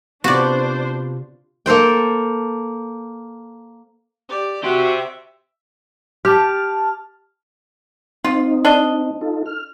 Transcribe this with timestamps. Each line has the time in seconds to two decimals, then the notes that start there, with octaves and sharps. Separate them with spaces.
0.24 C3 B3 D4 F4 F#4 C5 D5
1.66 A#3 A4 C5 G5
4.29 G4 D5
4.63 F#4 G4 C5 E5
6.25 G4 A5 F6
8.24 C4 D#4 F4
8.65 D4 D#5
9.21 D#4 F4 A4
9.46 F6